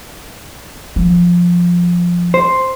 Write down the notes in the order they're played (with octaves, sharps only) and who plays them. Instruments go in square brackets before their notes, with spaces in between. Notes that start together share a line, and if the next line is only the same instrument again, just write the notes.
[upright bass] F3
[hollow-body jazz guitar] C5